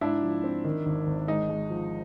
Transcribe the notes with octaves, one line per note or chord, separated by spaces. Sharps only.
G#2 D4 E4
F3
C4
D#3
G#1
G#1
G#3 D#4
G#3
F3